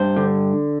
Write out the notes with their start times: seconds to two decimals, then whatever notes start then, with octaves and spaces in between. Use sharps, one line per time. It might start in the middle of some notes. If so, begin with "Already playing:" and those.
Already playing: G2 C5
0.17 D3